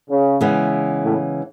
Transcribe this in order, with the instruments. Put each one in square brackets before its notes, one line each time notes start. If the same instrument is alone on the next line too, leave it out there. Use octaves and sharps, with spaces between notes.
[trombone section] C#3
[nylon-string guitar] C#3 E3 G#3 B3
[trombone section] A2